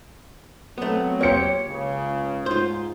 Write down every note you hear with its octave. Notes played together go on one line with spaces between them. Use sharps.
F#3 A3 B3 C4
A#3 G4 C5 C#5 C#7
C#2 C#3
G#2 F4 C5